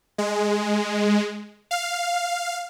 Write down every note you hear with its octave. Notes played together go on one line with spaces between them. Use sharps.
G#3
F5